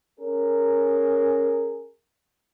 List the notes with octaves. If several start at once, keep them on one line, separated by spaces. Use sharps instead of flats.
C#4 G#4 A#4